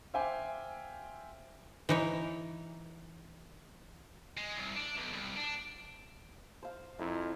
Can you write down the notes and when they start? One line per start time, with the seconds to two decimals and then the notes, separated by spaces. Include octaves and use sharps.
0.14 C5 E5 F5 G5 G#5 D6
1.89 E3 D#4 C#5
4.38 G#3
4.57 C2
4.76 D4
4.98 B1
5.13 C2
5.37 D4
6.63 C5 F5
6.99 F2 D#4 E4 A#4